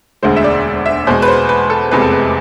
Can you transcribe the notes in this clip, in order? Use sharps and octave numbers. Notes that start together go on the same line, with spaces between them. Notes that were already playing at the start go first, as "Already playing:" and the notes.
E1 D2 D3 G#3 C5
E5
D5
E5
E2 B2 G#3 C5
B4
C5
B4
A4
F1 E2 C3 G#3 B4
A4
B4